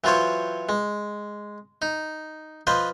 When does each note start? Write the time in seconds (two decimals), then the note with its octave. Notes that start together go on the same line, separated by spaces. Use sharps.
0.04 E3 F#3 F4 C5 C#5
0.69 G#3
1.82 D#4
2.67 F3 B4 C5 D#5